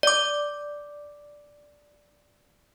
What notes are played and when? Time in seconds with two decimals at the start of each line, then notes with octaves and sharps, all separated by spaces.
0.03 D5 D6